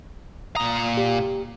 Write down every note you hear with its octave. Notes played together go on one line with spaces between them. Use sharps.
A#2 A#5 D#6
G4